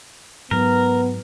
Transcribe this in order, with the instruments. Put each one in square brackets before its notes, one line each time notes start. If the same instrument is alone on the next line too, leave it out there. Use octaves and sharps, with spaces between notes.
[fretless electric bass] G#2 F#3 [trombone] B3 [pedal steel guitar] A#4